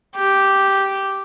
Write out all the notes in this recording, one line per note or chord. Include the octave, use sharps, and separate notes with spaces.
G4